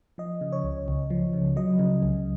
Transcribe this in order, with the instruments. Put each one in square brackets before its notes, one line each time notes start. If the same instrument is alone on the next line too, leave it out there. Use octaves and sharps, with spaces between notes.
[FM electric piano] F3 D#5
C#3
C#5
C#2
C#2
F3
C#3
F#3 D#5
C#3
C#2